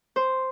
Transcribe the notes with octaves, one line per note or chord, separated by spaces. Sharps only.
C5